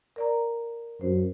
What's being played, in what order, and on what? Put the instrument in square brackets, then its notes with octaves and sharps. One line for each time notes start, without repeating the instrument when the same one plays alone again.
[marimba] A#4 D5 A#5
[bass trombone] F#2 [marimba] C5